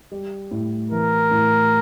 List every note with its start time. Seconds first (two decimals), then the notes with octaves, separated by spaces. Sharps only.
0.12 G3
0.51 A2
0.91 E3 A#4
1.31 A2